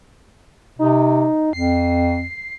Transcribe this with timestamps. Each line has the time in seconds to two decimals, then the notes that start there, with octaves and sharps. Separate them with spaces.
0.79 C3 D#4
1.53 F2 C7